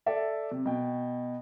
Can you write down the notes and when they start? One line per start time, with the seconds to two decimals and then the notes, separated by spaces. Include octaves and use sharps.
0.06 A4 D5 E5
0.51 C3
0.65 B2 G5